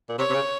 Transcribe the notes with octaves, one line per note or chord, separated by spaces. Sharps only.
A#2
C3 C#5
C3
C#3